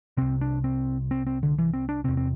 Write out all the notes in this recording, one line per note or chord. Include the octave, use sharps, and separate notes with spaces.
C2 C3 C4
D4
C4
C4
C4
D3
E3
C4
D4
E2 C3 C4
C4